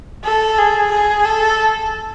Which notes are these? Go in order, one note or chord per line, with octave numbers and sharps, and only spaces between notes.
A4
G#4
G#4
A4